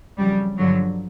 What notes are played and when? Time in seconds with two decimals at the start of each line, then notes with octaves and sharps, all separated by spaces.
0.18 F2 C#3 F#3 G3
0.57 G2 D3 F3 F#3